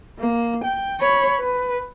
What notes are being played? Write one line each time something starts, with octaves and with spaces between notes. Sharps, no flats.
A#3
G5
C#5 B5
B4